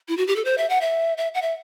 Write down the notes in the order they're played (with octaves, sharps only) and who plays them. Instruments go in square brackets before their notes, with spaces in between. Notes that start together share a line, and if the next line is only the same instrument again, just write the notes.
[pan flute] E4
F#4
G4
A4
C5
E5
F#5
E5
E5
F#5
E5